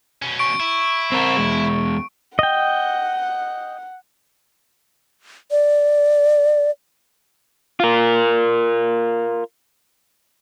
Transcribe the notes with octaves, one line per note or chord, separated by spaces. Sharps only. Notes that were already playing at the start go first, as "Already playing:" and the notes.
B2 C#4
C#6 D7
E4
C4 A#4
E2 G#3
D#5 F#5 G5
D5
F4 A#4